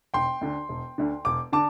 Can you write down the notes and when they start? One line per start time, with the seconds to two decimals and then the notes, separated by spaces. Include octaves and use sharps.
0.14 E1 G5 C6
0.41 D2 D3
0.69 E1
0.98 D2 D3
1.25 E1 D6
1.52 D3 A5 D6